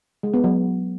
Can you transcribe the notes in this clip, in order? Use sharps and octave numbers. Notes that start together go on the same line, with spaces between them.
G#3
B3
F#3